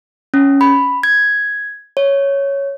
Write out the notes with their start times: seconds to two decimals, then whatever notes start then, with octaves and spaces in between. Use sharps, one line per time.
0.34 C#4
0.61 B5
1.03 G#6
1.97 C#5